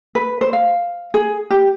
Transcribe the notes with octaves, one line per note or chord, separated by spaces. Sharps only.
B4
C5
F5
G#4
G4